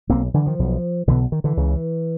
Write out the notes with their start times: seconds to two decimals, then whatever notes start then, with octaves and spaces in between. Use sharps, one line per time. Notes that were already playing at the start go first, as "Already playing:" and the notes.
0.09 B1 B2 A#3 C4
0.34 D3 E3
0.46 D#3 F3
0.59 B1 B2
1.07 B1 B2 D3 E3
1.32 D#3
1.44 D3 E3
1.57 C#2 C#3